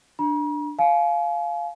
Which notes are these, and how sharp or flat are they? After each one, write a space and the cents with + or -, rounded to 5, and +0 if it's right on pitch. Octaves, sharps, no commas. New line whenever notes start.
D4 +10 A#5 +45
F5 +0 G#5 +40